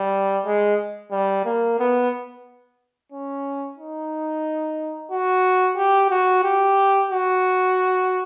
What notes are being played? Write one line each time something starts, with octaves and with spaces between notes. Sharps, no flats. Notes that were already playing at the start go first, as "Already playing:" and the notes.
Already playing: G3
G#3
G3
A#3
B3
C#4
D#4
F#4
G4
F#4
G4
F#4